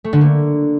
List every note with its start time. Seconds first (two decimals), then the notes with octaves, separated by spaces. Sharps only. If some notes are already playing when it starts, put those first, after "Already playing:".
0.04 A3
0.13 D3
0.21 A#3